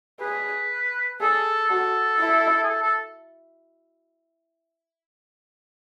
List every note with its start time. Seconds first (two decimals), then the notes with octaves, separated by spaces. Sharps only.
0.20 G#4 B4
1.20 G#4 A4
1.70 F#4 A4
2.20 E4
2.63 G#4
2.70 A4
2.82 A4